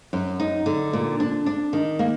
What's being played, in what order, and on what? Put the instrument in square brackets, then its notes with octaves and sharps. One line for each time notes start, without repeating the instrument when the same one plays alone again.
[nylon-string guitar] F#2
D#4
D3
A#2
D4
D4
D#3
A#3